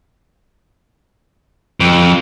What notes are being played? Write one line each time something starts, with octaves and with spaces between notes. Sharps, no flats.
F2